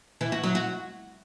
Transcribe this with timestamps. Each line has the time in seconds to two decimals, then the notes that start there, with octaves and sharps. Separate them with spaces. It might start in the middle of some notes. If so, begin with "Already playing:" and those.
0.21 E3
0.32 F#4
0.44 F#3
0.55 F#4